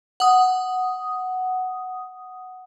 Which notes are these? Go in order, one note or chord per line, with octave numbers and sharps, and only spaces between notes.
F#5 D#6